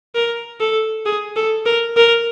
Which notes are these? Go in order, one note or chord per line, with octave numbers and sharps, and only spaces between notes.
A#4
A4
G#4
A4
A#4
A#4